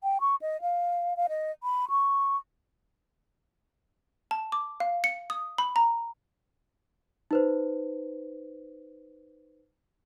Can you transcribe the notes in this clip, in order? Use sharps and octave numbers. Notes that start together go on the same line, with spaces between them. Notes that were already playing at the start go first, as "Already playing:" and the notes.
G5
C#6
D#5
F5
F5
D#5
B5
C#6
A5
D6
F5
C#7
D#6
B5
A#5
D#4 B4 C5